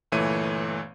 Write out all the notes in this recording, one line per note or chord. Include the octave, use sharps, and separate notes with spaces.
G1 A#2 E3 A3 C#5 D#7